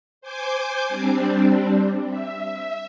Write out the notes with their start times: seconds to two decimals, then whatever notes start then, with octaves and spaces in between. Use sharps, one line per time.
0.21 C5 G#5 D6 G6
0.89 G3 C4 D4
2.09 E5